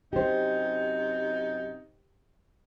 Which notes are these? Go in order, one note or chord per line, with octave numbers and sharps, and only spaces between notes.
F#2 C3 D#4 G4 C5